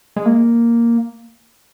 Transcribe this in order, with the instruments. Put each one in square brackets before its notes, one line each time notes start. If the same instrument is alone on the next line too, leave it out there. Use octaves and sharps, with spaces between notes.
[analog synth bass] G#3
A#3